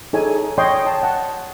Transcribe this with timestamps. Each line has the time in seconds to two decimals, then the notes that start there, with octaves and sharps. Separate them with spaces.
0.13 D#4 G#4 A4 C#5 G#5
0.58 C#5 D#5 G5 C6
0.86 A5
1.03 F#5 A5